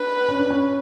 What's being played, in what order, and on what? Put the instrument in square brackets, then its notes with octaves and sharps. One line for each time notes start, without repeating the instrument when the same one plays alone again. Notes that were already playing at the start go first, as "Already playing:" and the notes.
Already playing: [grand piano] D4 [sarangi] B4
[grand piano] C#4
D4
C#4